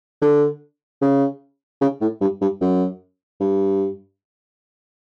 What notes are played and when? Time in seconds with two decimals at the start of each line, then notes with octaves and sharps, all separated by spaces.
0.22 D3
1.01 C#3
1.81 C#3
2.01 A2
2.21 G2
2.41 G2
2.61 F#2
3.40 G2